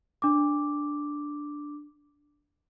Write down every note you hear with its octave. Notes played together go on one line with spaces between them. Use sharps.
D4 D6